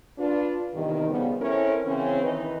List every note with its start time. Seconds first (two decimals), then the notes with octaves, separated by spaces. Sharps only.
0.19 D4 F4 B4
0.73 E2 G2 C3 D#3
1.09 C#3 F3 G3 B3
1.40 C4 C#4 E4 A4 A#4 C#5
1.85 C#3 E3 C4 C#4
2.22 D#3 E3 D#4 B4